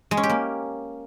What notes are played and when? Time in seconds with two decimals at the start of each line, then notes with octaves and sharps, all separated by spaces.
0.11 G#3
0.17 C#4
0.23 G4
0.29 A#3